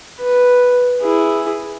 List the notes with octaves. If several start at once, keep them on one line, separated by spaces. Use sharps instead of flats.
B4
E4 G#4